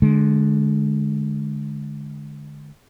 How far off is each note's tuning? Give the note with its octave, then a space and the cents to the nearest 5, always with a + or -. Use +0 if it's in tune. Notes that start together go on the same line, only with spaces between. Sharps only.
D3 +5 G#3 +25